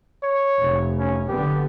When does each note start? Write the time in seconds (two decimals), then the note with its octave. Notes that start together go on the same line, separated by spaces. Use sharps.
0.23 C#5
0.60 F1
0.99 C#4
1.28 F#1 D3 B3 G4